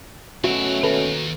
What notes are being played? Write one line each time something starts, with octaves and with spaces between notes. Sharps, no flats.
B2 F#3 A3 C#4 E4 F#4 E5
D#2 A4 B4